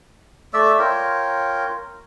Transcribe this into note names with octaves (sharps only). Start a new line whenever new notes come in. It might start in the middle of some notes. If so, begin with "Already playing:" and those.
A3 D5 E5 E6
F4 A#4 C#5 G5